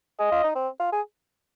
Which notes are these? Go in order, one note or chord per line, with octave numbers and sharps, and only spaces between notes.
G#4 D#5
F4
D#4
C4
F4
G#4